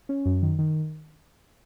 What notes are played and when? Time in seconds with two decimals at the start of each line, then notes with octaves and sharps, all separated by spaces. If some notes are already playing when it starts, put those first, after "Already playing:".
0.09 C#4
0.25 F#2
0.42 D#3
0.59 D#3